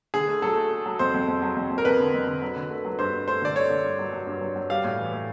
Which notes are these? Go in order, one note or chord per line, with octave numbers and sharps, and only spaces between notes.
D3 G#4
A3
F#3 A4
A3
A3
F#3
F2 C5
F2
F2
F#3
F2
F2
A#4
F2 B4
D3
F2
D3
F#3
D3
A3
F#3
G2 C5
G2
A3 C5
D3 D5
A3 C#5
D3
G2
F#3
F#3
G2
F#3
F#3
G3 F5
A2
E3
A2